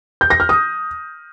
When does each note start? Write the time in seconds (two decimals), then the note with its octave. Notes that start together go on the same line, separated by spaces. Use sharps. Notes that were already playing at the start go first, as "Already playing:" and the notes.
0.21 G6
0.30 A#6
0.40 F6
0.49 D#6